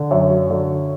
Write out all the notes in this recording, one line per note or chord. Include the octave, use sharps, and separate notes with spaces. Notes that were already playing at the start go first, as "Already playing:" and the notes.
Already playing: D3
F#2 C#5 E5
F#3
D3